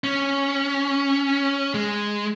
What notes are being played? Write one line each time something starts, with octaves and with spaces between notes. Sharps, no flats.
C#4
G#3